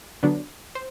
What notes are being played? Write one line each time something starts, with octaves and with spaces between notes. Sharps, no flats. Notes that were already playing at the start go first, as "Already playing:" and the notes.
D3 F#3 B3 D4
C5